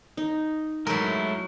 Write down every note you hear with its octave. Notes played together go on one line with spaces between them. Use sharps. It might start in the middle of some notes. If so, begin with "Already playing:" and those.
D#4
F#3 G#3 A3 E4 A#4